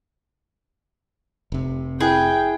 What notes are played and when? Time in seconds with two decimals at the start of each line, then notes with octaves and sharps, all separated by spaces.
1.52 F1 C3
2.01 E4 G#4 B4 G5